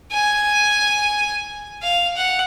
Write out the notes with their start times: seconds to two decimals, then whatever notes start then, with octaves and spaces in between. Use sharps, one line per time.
0.12 G#5
1.83 F5
2.17 F#5